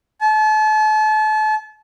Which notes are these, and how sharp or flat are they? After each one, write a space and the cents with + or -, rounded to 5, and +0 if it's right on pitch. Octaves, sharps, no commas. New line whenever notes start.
A5 -35